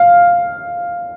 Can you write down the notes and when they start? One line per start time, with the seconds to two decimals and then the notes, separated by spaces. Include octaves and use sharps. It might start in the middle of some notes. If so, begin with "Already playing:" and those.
Already playing: F5